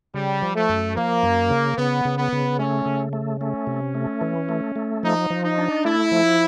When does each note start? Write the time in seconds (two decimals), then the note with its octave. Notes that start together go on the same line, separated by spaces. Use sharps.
0.14 C#3 G3
0.42 F3
0.55 A3
0.69 F#2
0.96 F3 A#3
1.23 F#2
1.50 C#3
1.78 C#3 B3
2.05 C#3
2.18 B3
2.32 C#3
2.59 A3 C#4
2.86 C#3
3.13 A3
3.41 A3 C#4
3.67 C3
3.95 A3
4.21 E3
4.49 A3
4.76 A3
5.03 F3 D#4
5.30 F3
5.44 D#4
5.58 D4
5.85 A3 E4
6.12 F3